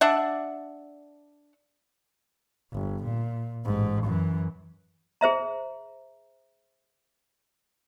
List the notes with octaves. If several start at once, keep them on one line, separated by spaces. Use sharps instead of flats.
D4 E5 F#5
G1
A#2
A1 G#2
F#2 E3
G#4 C5 E5 A#5